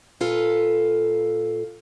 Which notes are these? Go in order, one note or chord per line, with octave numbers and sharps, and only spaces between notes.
A#2 F4 A4 B4